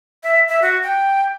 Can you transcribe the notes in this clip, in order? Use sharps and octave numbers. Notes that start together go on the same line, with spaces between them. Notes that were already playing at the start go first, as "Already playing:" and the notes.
E5
E5
F#4
G5